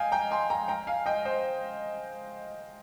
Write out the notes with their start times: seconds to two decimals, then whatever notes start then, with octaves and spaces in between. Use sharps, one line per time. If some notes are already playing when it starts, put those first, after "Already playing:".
Already playing: D#5 F5 G5 G#5
0.12 G5 A#5
0.31 G#5 C6
0.50 G5 A#5
0.68 G5 A#5
0.87 F5 G#5
1.06 D#5 G5
1.25 C5 D#5